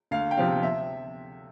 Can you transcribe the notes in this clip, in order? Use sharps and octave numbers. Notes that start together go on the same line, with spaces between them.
D2 F5
G5
C3 F3 C4 F5
E5